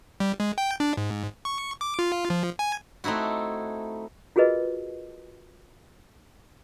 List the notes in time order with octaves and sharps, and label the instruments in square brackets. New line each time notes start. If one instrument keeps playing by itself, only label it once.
[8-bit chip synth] G3
G#3
G5
D4
G#2
C#6
D6
F4
F3
G#5
[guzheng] A3 C4 D#4 E4 F#4
[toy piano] F4 F#4 G#4 A#4 B4 D#5